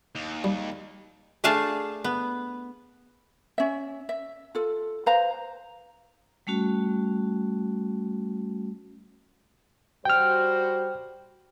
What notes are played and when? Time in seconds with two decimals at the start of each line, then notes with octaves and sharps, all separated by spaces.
0.15 D#2
0.44 G3
1.44 A3 D4 G#4 F5 G#5 A5
2.04 B3
3.58 C#4 E5
4.09 E5
4.55 F4 A4
5.06 B4 C5 F5 A#5
6.47 G3 A3 C#4 F#4
10.05 G3 F#4 C5 G5 F6